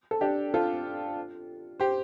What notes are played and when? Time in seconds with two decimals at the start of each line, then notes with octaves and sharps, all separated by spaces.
0.11 A4
0.21 D4 G4
0.54 F4 A4
1.80 G4 C5